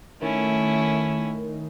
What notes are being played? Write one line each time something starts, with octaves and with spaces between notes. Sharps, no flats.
D#3 A3 C#4 E4